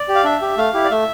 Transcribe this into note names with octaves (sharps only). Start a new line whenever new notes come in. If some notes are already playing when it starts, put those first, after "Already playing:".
Already playing: D5
G4
F5
D4 E5
G4
A3 F5
E4 G4
D5
A3 E5